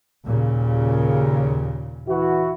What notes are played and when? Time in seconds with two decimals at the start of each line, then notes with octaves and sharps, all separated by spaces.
0.24 D#2 A#2 C#3
2.07 E3 E4 F#4